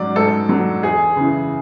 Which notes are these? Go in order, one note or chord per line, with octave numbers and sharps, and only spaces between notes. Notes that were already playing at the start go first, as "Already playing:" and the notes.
Already playing: G#2 F#3 D5
G#2 A4
F#3
E2 G#4
C#3 E3